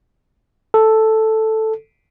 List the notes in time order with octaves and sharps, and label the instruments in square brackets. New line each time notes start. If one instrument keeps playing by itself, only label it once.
[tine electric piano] A4